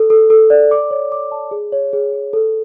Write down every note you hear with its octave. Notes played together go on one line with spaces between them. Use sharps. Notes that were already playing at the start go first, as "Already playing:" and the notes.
Already playing: A4
A4
A4
D5
D6
C#5
D6
A5
G#4
C#5
G#4
G#4
A4